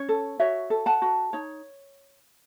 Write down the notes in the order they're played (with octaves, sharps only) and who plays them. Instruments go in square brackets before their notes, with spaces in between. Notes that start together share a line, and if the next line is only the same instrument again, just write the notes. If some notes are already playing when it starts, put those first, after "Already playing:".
Already playing: [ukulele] C#4 C#5
A4
F#4 C#5 E5
A4
F#5 A5
F#4
D#4 C#5